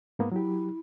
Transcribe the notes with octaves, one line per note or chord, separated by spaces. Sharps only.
G#2 A#3 B3
F#3 E4 G4